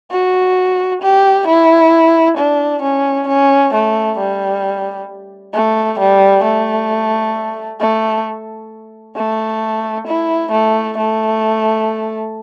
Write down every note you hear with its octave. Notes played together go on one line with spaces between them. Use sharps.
F#4
G4
E4
D4
C#4
C#4
A3
G3
A3
G3
A3
A3
A3
E4
A3
A3